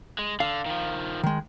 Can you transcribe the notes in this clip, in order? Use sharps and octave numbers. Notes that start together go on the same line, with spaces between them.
G#3
D3 F5
D#3 F3
D#3 G#3